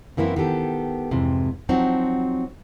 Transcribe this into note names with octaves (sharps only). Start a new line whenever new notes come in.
F#2 E3 A#3 C4 E4
D#3 B3 G4 A4
F2 G#2 C3 E3
F3 F#3 C4 D#4 F#4